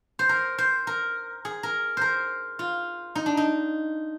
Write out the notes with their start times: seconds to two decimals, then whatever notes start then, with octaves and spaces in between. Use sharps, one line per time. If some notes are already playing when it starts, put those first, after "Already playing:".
0.19 C5
0.29 A#4
0.58 C5
0.87 A#4
1.45 G#4
1.63 A#4
1.97 A#4 C5
2.59 F4
3.15 D#4
3.26 D4
3.37 D#4